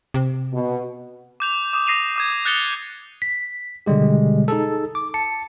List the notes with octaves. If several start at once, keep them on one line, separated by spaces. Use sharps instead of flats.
C3
B2
D6 G6 F7
D6 D#6
D#6 A#6 C7 D#7 F7
D6 D#6 G#6
F#6 G6 A6 C#7 F7 G7
B6
B2 D3 G3 G#3 G4
D#4 G#4 A4
D6
A5 C#7